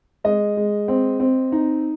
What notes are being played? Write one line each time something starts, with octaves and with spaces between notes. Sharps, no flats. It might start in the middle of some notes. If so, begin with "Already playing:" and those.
G#3 D#5
G#3
C4
C4
D#4